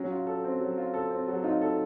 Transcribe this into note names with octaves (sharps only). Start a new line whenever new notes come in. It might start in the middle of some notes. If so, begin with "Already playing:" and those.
Already playing: F#3 C#4
F4
A4
C4
F#3
F4
A4
C4
F#3
D#4 F4
A4